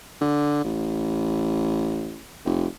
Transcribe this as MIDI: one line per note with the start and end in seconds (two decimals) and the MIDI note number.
0.21 0.62 50
0.64 2.21 33
2.45 2.66 29